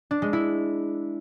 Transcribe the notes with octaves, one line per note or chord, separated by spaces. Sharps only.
D4
G#3
E4